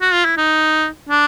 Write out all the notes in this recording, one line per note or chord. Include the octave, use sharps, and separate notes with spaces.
F#4
F4
E4
D#4
D4